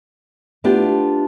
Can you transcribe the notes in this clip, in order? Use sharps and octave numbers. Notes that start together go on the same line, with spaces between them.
A3 B3 D4 F4 G4